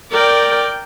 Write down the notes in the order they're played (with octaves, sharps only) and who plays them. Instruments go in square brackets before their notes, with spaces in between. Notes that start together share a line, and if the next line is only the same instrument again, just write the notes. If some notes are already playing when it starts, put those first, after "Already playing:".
[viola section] A#4 D5 G5